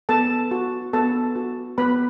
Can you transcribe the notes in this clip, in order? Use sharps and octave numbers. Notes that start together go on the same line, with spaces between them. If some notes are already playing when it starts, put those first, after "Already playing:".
B3 A4 A5
F#4
B3 A4 A5
F#4
B3 B4 B5